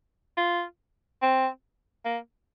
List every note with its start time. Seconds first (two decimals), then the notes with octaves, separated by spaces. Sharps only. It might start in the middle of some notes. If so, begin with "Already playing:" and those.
0.37 F4
1.22 C4
2.05 A#3